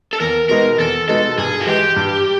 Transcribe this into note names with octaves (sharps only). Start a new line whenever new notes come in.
A4
E2 A#4
B2 G#3 B3 D#4 A#4
E2 A4
B2 G#3 B3 D#4 A4
G2 G#4
F#4
E3 G#3 G4
G2